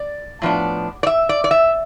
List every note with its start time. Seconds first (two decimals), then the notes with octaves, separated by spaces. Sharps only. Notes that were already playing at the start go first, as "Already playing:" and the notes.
Already playing: D5
0.42 A2 F3 B3 D4
1.03 D5
1.07 E5
1.29 D5
1.44 D5
1.51 E5